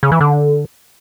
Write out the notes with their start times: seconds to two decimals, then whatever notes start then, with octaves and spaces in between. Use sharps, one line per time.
0.03 C#3
0.12 E3
0.21 D3